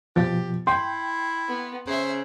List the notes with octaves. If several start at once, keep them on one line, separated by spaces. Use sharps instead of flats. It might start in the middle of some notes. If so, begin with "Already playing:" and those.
B2 F3 G4 A6
E4 G5 C6
B3
C#3 C5 E5